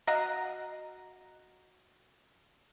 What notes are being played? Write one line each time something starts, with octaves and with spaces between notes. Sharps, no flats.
F#4 D#5 F5 A#5